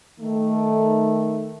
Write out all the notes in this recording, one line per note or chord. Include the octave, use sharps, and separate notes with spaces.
D#3 A3